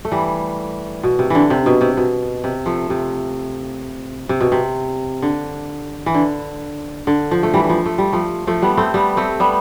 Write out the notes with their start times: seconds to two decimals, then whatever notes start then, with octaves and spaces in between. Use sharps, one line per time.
0.05 A3
0.11 E3 G3
1.03 B2
1.19 C3
1.30 D3 E3
1.50 C3
1.66 B2
1.81 C3
1.97 B2
2.44 C3
2.66 F3 A3
2.90 C3
4.29 C3
4.41 B2
4.52 C3
5.22 D3
6.06 E3
6.15 D3
7.07 D3
7.31 F3
7.43 A3
7.54 E3 G3
7.64 G3
7.70 F3
7.86 A3
7.98 G3
8.12 F3 A3
8.47 F3 A3
8.62 G3 B3
8.77 A3 C4
8.94 G3 B3
9.17 A3 C4
9.40 G3 B3